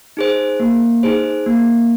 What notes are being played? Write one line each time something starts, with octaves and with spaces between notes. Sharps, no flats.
D#4 G#4 C5
A#3
D#4 G#4 C5
A#3